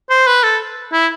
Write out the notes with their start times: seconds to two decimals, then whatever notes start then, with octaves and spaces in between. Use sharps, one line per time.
0.10 C5
0.27 B4
0.43 A4
0.92 E4